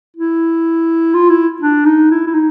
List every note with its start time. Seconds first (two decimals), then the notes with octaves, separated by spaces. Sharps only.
0.16 E4
1.14 F4
1.30 E4
1.62 D4
1.86 D#4
2.11 E4
2.27 E4
2.34 D#4